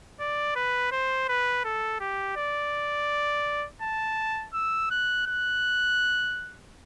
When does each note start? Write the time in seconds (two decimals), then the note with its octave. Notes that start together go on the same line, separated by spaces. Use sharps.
0.20 D5
0.56 B4
0.91 C5
1.29 B4
1.64 A4
2.00 G4
2.37 D5
3.82 A5
4.54 E6
4.91 F#6
5.27 F#6